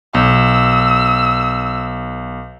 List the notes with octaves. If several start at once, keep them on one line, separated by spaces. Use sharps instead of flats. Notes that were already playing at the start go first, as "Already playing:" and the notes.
B1 E6